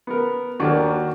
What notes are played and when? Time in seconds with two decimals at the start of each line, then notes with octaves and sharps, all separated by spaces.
0.07 B3 A#4
0.60 D#2 D4 F#4 A#4